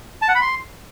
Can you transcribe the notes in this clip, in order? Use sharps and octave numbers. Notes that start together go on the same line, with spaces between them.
A5
F#5
B5
C6